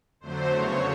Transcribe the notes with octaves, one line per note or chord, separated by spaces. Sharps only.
F2 D3 F#3 A3 C5
E2 C#3 F#3 C#5